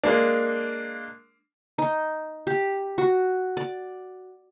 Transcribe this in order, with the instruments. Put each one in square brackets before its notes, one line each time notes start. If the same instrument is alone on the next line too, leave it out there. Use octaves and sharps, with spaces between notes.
[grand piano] G#3 A#3 D4
[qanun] D#4
G4
F#4
D5